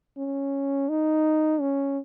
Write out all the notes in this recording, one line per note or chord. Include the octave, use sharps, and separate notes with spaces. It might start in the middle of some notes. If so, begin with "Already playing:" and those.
C#4
D#4
C#4